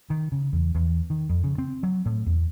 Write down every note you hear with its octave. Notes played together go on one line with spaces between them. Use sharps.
D#3
C#3
E2
E2
D#3
F2
C#3
C4
F#3
A2
E2